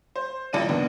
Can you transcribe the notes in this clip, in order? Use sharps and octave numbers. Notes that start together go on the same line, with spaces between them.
C5
A1 F2 D5 D#7
D#2 B3 D4